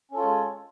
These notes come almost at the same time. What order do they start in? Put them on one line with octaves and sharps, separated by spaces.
C#4 A4 F4 C#5 G#3